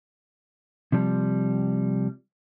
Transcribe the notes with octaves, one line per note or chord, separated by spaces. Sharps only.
C3 F3 G3